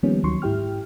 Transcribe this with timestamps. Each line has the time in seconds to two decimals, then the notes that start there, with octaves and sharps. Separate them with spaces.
0.03 D#3 F3 G3 A#3 B3 C#4
0.23 D2 D#3 F#3 C6 C#6
0.42 G#2 E4 G4 G5 F6